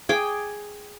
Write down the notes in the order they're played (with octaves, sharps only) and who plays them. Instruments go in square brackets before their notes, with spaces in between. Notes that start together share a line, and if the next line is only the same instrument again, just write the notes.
[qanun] G#4 G5 D6